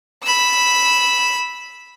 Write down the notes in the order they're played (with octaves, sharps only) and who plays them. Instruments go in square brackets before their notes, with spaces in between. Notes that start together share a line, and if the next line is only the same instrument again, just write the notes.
[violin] B5 E6